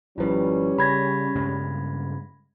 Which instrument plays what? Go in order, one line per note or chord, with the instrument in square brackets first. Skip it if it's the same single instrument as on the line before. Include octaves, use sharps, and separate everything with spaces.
[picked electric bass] G#1 F3 [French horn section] G3 C#4 [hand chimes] E4 B4
[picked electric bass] C#3 [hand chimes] B5 G#6 A#6
[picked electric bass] G2 C#3 G#3